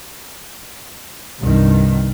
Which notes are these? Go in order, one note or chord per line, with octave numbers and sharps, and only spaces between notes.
C2 G2 D#3